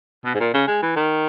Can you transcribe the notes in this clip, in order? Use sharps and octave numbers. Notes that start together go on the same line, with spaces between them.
B2
G#2
A#2
C#3
G#3
E3
D#3